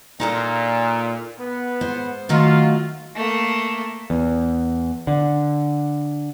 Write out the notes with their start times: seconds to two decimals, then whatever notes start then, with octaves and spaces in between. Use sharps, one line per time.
0.20 A#2 D#4 A4 A#5
1.39 B3
1.81 G#2 C5
2.29 D#3 F#3 A3 F4
3.16 A3 A#3
4.10 E2
5.07 D3